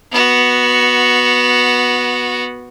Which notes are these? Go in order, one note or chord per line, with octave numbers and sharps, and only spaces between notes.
B3 F#4